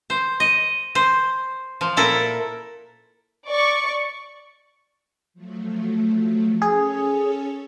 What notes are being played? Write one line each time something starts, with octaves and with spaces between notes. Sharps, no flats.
C5
D#5
C5
F3
A#2 E4 A4 A#4
D5 C#6
F3 F#3 A3
C#4 G#4 A4 C#5